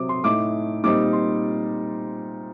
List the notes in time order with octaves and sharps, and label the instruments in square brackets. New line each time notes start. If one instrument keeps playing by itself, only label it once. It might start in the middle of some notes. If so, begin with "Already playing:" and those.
Already playing: [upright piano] C3 F#3 C4 D6 D#6
C6
A2 A3 D#4 D6
A#2 G3 C4 D#4 D6
C6